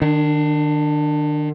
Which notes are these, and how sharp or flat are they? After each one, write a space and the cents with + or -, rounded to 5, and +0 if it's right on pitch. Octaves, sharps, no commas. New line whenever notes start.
D#3 -30 D4 +15